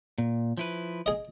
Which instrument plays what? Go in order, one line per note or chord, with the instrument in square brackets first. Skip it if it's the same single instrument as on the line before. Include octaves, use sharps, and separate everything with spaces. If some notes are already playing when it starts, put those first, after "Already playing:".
[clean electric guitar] A#2
F3 E4 B4
[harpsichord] G#4 D#5